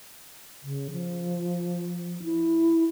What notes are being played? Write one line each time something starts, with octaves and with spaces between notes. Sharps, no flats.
C#3
F3
E4